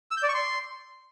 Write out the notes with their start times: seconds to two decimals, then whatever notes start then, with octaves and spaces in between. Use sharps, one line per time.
0.11 E6
0.17 G6
0.23 D5
0.29 C#6
0.34 C6